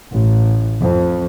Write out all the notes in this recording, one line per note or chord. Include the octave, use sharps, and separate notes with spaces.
A1
F2